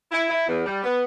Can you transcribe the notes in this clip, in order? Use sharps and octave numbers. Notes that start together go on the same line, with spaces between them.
E4
E4
E2
G3
B3